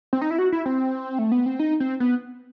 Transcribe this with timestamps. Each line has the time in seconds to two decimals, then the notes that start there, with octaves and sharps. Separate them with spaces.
0.13 C4
0.21 D#4
0.31 E4
0.39 F#4
0.52 E4
0.66 C4
1.19 A3
1.32 B3
1.46 C4
1.59 D#4
1.80 C4
2.00 B3